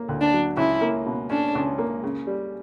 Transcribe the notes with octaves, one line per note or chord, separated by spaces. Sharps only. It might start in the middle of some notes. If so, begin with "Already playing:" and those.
Already playing: A#3
D2
D4
F#3
C#2 E4
A#3
B2
C#4 D4
C#2
A#3
C#3
G3